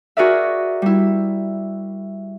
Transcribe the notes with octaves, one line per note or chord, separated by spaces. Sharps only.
F#4 G#4 A#4 D5 E5
G3 E4